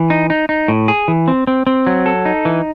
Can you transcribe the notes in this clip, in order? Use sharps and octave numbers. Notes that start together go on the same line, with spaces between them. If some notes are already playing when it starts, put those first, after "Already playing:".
Already playing: E3
D#4
D#4
D#4
A2
G#4
E3
C4
C4
C4
F#3
A4
D#4
E3